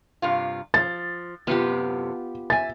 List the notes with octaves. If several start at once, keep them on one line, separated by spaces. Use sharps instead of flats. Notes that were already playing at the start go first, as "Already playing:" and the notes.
G2 C3 F4
F3 A6
F#2 A2 C3 B3 F4 G4
E5 G#5 A6